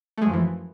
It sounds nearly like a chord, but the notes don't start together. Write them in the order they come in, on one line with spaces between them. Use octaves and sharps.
A3 G#3 F#2 F3 E3